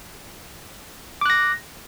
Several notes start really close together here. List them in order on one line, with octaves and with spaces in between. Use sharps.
D6 F#6 A#6